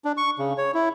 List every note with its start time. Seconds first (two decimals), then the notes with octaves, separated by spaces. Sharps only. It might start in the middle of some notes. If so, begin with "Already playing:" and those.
0.05 D4
0.17 C#6
0.39 C#3
0.58 C#5
0.74 E4